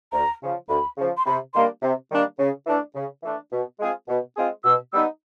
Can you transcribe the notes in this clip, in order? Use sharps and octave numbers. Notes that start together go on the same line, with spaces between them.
D2 A#5
C#3 F3
D2 B5
C#3 F3
C6
C3 B5
D#3 G3 A#3 D4 C6
C3
D#3 G3 A#3 D4
C#3
E3 A3 D4
C#3
E3 A3 D4
B2
G#3 C4 F4 G#4
B2
G#3 C4 F4 G#4
B2 E6
G3 B3 D#4 E6